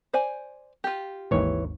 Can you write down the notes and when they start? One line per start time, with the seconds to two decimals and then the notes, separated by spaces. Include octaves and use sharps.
0.14 C5 D5 G#5
0.84 F4 G4
1.31 G#1 D#2 G#2 E3 C#5